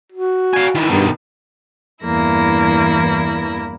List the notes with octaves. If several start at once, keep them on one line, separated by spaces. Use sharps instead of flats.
F#4
F5 G#5
D#3 E3
G2 B2 D#3
E2 G2 E3 A#3 E4 A#6